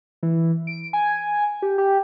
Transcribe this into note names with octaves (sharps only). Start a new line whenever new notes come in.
E3
D7
G#5
G4
G4